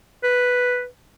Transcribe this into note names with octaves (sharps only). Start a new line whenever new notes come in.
B4